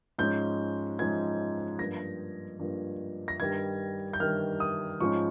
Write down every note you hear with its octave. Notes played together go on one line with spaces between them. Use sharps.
G#2 F3 G#3 C#4 G6
G#2 F3 G#3 C#4 G#6
G2 F3 A#3 A#6
G2 F3 A#3
A#6
G2 D#3 G3 G#6
G6
G2 D#3 G3 F6
D#6
G#2 F3 G#3 C#4 C#6